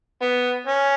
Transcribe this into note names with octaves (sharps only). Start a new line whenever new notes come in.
B3
C#4